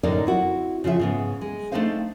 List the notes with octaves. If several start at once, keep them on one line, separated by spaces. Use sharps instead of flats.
F#2 A2 D3 D#4 A#4 D5
C4 E4 F#4
C#3 F3 F4 E5
G#2 C#3 B3
G#3
A3 C4 D4 D#4 C5 F5